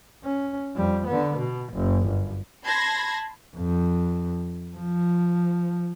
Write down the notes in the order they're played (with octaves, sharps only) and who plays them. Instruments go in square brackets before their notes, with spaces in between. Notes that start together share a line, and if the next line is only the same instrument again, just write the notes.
[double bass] C#4
F2 G3
D3 B3
B2
F#1 F#2
G1
[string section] A5 B5 C6 G#6 A#6
[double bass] F2
F3